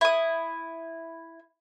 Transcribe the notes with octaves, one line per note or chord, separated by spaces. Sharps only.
E4 D#6